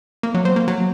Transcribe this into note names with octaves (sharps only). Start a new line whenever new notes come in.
A#3
F#3
C4
A#3
F#3